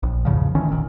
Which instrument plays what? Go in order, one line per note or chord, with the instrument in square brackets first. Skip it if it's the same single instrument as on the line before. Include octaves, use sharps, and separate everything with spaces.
[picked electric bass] A#1
E2 G#2 C#3 F3
D2 D#3 E3 C#4
D#1 A#1 D#3